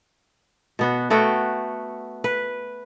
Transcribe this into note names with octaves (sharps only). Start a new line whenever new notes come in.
B2 B3 F#4
A3 B3 F#4 G5
B4